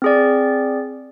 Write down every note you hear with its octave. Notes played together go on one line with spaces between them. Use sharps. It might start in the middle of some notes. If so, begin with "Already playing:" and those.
C4 G#4 D5